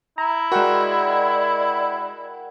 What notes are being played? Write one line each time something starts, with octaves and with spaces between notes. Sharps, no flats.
E4 A#5
G#3 F#4 A#4 D5 D#5 F#5 G5